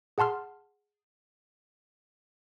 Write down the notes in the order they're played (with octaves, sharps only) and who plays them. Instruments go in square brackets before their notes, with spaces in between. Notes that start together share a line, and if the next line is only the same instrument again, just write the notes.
[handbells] G#4 F#5 A5 C6 F6